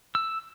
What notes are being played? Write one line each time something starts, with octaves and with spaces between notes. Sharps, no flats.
E6